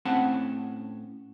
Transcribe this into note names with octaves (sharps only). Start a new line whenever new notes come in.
A2 C4 C#4 F#5 A5 B5